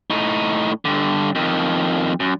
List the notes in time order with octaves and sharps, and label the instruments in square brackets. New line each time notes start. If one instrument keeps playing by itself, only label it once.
[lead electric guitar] A2 D#4
G2 D3
F2 D#3
F#2